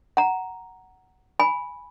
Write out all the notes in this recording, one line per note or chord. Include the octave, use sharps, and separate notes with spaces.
F#5 A#5
G#5 B5